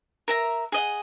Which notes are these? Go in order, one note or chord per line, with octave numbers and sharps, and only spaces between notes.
A#4 E5 A#5
G#4 D#5 F#5